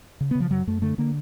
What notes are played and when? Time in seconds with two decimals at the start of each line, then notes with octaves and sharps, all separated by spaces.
0.21 C#3
0.31 B3
0.35 C#3 F3
0.51 F#2 F#3
0.67 F#2 A3
0.82 D3 A3
0.98 D3 A#3